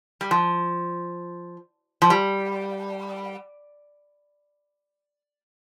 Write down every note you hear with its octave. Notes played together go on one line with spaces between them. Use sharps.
G3
F3
F3
G3